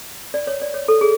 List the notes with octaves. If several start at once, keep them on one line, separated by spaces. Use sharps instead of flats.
D5
C#5
D5
C#5
A4
G#4